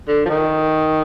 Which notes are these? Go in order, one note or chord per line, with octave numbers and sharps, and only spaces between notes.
D3
F3
D#3